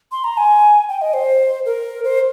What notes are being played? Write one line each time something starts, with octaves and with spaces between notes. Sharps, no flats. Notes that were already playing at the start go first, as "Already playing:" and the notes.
C6
A#5
G#5
G5
D#5
C5
A#4
C5